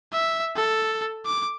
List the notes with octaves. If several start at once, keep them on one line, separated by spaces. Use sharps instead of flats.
E5
A4
D6